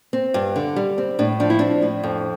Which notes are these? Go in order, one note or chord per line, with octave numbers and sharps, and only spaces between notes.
C4
G2
D3
G3
C4
A2 D4
F3 D4
E4
C4 D4
A2
F2